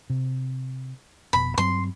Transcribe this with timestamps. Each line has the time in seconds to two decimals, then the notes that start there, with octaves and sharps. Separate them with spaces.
0.10 C3
1.33 F1 B2 B5
1.58 G2 F#3 C4 C6